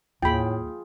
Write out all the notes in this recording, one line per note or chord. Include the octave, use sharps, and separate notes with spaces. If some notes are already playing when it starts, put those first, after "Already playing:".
D#2 A2 G3 F4 G#4 G5 B5